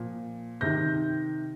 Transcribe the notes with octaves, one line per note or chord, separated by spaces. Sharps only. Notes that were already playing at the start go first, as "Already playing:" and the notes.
Already playing: A#2 F3
C3 D#3 G6 A#6